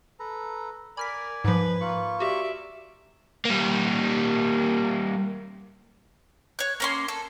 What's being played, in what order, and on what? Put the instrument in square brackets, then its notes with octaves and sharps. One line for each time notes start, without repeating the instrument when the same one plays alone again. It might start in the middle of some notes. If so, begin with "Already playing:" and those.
[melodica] A4 B4 A#5
[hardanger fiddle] A#4 [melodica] D5 G#5 [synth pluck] B5 F6 B6
[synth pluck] G#2 F3 [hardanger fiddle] B4
[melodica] A#3 F4 C#6
[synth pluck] F#4 G4 [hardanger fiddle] D5 E5
[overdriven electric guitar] G3 A#3
[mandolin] C#5 F#6
A#3 C#4 C6
A4